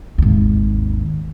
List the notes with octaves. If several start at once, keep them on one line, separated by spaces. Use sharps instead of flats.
G#1 D#2